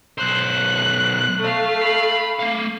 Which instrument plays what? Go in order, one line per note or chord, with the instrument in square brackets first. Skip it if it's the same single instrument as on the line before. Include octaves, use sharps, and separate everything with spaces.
[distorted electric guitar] B1 C5 [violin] F#6
[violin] A3 F5
[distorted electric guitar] B5
A3 F5